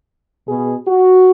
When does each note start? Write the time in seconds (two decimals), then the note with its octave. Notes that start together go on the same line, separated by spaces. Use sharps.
0.48 B2 G#4
0.87 F#4